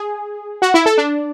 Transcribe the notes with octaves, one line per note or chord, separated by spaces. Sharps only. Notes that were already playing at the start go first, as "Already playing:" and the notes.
Already playing: G#4
F#4
E4
A4
D4